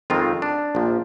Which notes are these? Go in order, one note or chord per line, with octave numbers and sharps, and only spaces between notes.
F2 D#3 G#3 C4 F4
D4
A#1 A#2 F3